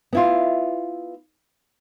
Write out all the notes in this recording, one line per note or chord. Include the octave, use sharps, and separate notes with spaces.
B3 E4 F4